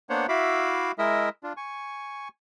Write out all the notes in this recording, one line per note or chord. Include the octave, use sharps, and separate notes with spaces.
A#3 B3 D4 C5 C#5 F#5
E4 F#4 E5 F5 B5 D6
G#3 E4 A#4 D#5 E5
D4 F4
G#5 C#6